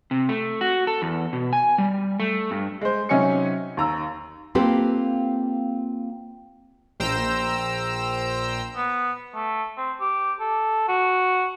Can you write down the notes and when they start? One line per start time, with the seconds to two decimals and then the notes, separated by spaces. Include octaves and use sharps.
0.11 C3
0.29 A3
0.61 F#4
0.87 A4
1.02 E2
1.33 B2
1.53 G#5
1.78 G3
2.20 A3
2.51 G2
2.81 G#3 C5
3.09 C3 F#3 C#4 D#4 G#5 C#7
3.77 D#2 A#5 E6
4.55 A#3 C4 F4 G4 A4 B4
7.00 A#1 C5 G5 A#5 E6
8.76 B3
9.35 A3
9.77 C4
10.00 G4
10.40 A4
10.88 F#4